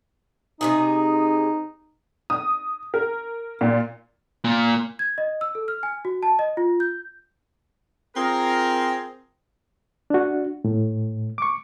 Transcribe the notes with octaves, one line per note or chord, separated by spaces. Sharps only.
C3 D#3 D#4 G#4
D#6
A#4
A#2
A#2
G#6
D#5
E6
A4
F6
G#5
F#4
A5
D#5
F4
G6
C4 F4 G#4 A#4
D4 F#4
A2
C#6 D6